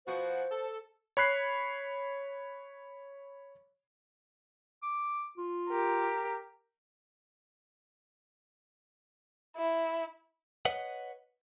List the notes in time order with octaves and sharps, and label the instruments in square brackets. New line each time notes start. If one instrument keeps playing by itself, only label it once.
[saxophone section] B2 F3 F#4 [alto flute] C5
[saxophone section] A4
[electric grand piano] C#5 B5 F#6 C7
[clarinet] D6
F4
[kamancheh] G4 A#4
[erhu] E4
[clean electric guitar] B4 C#5 D#5 F#5